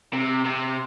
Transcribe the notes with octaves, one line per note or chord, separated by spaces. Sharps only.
C3
C3